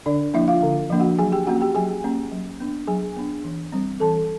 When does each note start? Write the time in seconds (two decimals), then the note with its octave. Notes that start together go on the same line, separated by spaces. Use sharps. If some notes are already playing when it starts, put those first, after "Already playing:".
0.06 D3 D4 D5
0.34 F3 A#3 D4 E4 E5
0.48 F4 F5
0.63 D3
0.90 F3 A#3 D4
1.00 F#4 F#5
1.19 F#3 G#4 G#5
1.32 G4 G5
1.47 A#3 C#4 F#4 F#5
1.61 G4 G5
1.75 F#3 G#4 G#5
2.04 A#3 C#4
2.31 F#3
2.60 B3 D4
2.87 F#3 G#4 G#5
3.16 B3 D4
3.44 E3
3.72 G3 C4
4.00 E3 A4 A5